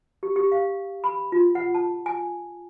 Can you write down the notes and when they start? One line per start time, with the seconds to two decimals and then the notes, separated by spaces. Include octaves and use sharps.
0.23 G4
0.36 G4
0.52 F5
1.04 B5
1.32 F4
1.55 F#5
1.74 A5
2.06 G#5